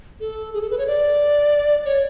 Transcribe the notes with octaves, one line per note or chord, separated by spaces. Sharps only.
A4
G#4
A4
B4
C#5
D5
C#5